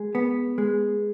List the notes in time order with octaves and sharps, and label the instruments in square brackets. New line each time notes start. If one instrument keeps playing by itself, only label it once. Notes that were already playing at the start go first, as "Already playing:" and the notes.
Already playing: [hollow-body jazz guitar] G#3
B3
G#3